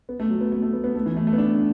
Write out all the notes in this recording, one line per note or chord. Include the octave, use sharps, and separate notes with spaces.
B3
A3
F#3
B3
A3
A3
B3
B3
A3
E3
A3
A3
B3
D4